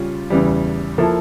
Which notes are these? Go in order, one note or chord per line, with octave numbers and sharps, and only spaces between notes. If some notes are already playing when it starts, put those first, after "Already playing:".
Already playing: C#3 G3 C#4 F4
E2 C#3 E3 G3
F3 A#3 E4 A4